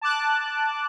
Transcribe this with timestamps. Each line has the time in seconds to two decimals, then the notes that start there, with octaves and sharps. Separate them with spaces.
0.01 A5 D6 F#6